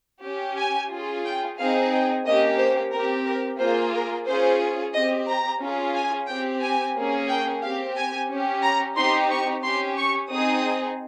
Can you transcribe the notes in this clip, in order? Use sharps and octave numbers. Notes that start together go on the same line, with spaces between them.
C#4 G4
G#5
C#4 F4 G#4
G5
C4 D#4 G#4 F5
G5
A#3 C#4 G4 D#5
C5
C4 G4 A#4
A#4
A#3 F4 G#4 C5
A#4
C#4 F4 G#4 C5
C4 G4 D#5
A#5
C#4 F4 G#4
G#5
C4 G4 G5
G#5
A#3 C#4 G#4
G5
C4 G4 F5
G#5
C#4 G4
A#5
C4 D#4 G4 C6
C#6
C#4 G4 C6
C#6
C4 D#4 G#4 D#6